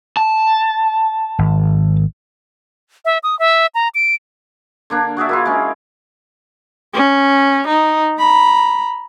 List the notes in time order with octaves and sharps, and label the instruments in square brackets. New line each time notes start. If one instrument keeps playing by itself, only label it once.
[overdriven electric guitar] A5
[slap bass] G#1
[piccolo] E5
D#6
E5
A#5
D7
[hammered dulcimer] D3 A#3 D4
F#4 G#4 D5 E5
A#3 E4 F4
G#3 C#4
[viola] C#4
D#4
A#5 B5